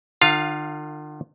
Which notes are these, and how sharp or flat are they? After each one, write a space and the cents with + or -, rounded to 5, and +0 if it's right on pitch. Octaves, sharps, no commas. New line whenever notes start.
D3 +45 F4 +10 F5 +0